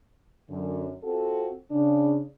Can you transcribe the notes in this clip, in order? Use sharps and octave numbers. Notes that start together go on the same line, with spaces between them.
F#2 D3
C4 F4 F#4 A4
C#3 D4